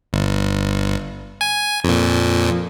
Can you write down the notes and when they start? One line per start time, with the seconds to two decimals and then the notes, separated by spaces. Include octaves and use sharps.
0.13 G1
1.41 G#5
1.84 F2 A#2